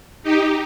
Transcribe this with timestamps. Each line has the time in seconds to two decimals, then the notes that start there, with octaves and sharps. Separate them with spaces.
0.23 D#4 G4